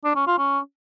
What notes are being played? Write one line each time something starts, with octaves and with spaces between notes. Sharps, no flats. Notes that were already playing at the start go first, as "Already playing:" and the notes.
D4
C#4
F4
C#4